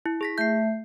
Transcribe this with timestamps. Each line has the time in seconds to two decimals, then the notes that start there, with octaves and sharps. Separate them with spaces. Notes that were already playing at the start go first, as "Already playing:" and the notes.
0.06 E4
0.21 G#4 A#6 B6
0.38 A3 E5 G6 C7